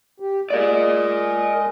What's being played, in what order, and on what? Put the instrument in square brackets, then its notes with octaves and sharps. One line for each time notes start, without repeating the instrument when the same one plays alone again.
[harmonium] G4
[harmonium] G#3 D#5 [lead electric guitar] A#4 D5